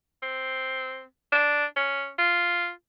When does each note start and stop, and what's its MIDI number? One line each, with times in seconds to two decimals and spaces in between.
0.22 1.03 60
1.32 1.65 62
1.76 2.10 61
2.18 2.71 65